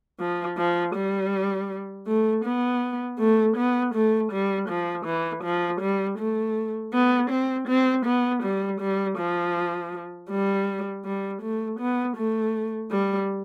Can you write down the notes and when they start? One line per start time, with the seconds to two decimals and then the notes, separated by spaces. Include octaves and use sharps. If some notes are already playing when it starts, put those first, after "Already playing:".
0.19 F3
0.57 F3
0.95 G3
2.07 A3
2.45 B3
3.19 A3
3.56 B3
3.94 A3
4.32 G3
4.69 F3
5.06 E3
5.44 F3
5.81 G3
6.18 A3
6.93 B3
7.30 C4
7.68 C4
8.05 B3
8.43 G3
8.81 G3
9.18 F3
10.30 G3
11.05 G3
11.42 A3
11.79 B3
12.17 A3
12.91 G3